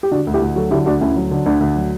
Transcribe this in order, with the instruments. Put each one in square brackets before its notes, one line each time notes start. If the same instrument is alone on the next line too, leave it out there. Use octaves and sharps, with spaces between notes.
[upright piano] G4
[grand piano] D3 [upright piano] D4 F#4
[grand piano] D2
[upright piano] E4 G4
[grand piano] D2
[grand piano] F#3 [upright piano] F#4 A4
[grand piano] D3 [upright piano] E4 G4
[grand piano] D2 [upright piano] D4 F#4
[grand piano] D2 [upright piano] C#4 E4
[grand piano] F#3
D3
[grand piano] D2 [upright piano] D4
[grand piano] D2
F#3